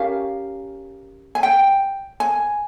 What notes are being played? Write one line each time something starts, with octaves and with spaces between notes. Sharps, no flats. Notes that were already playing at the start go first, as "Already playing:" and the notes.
Already playing: C#4 G4 A#4 F5
G#5
G5
G#5